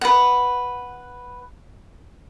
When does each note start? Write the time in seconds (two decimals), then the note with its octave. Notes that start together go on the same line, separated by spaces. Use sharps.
0.01 B4 F#5